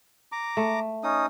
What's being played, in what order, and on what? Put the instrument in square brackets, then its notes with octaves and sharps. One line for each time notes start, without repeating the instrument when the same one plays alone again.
[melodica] A#5 D6
[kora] A3
[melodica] C#4 D#4 D#6